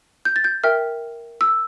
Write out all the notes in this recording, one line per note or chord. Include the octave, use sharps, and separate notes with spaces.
G6
A6
G6
A#4 E5 G5 F6
E6